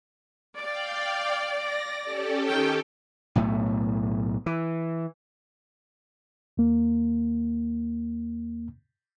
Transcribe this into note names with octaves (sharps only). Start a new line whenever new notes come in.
D5 F5 G5
A#6
C#4 G4 A4
D#3 G5
B1 A2 A3
E3
D#2 A#3